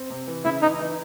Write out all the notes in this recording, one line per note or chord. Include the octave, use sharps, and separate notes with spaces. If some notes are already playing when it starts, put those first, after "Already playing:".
Already playing: C4
C3
E3
C#3 E4
E3 D#4
E3